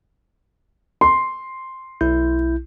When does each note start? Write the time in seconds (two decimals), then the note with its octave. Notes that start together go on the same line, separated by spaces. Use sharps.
1.01 C6
2.01 B1 E4 G6